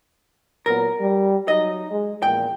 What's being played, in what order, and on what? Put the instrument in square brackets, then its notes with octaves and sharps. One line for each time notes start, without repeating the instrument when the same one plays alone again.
[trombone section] A#2 F#3 B3 [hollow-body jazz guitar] A#4
[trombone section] G3
[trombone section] F#3 D#4 [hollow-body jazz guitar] D#5
[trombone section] G#3
[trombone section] A#1 E2 A#2 [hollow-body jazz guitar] G5